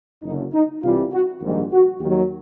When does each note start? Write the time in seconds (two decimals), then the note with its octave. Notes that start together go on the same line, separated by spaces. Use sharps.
0.23 F#1 F#2 D3 D#4
0.53 D#4
0.82 C2 C3 E3 G3 F4
1.12 F#4
1.42 A#1 G#2 D#3 G3
1.72 F#4
2.00 D#2 D#3 F#3 G4